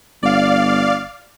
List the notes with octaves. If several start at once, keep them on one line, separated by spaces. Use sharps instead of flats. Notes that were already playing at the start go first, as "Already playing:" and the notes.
G1 D5 F5